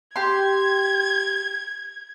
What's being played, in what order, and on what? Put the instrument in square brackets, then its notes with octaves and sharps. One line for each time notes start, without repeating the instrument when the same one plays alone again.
[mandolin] G4 C6 [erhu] G#6